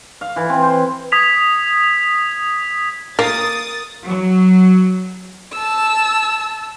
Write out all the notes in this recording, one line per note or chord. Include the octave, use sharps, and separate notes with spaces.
F5
E3
C4
C5
D#6 G#6 B6 F7
A#3 A#4 D#6 A6
F#3
A5 E6